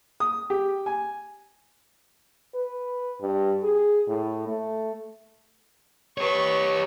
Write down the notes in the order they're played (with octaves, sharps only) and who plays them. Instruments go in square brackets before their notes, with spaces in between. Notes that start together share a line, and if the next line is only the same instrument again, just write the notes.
[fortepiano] D#6
G4
G#5
[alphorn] B4
G2
G#4
A2
A3
[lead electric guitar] G4 C#5 [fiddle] B4 C#6